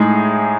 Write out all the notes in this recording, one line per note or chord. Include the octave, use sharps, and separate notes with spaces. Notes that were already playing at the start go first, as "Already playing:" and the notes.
Already playing: A2 G#3 D#4 G#4